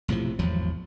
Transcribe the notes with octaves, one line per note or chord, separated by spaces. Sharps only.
B1 A2 C3 F3
G#1 E2 F3 F#3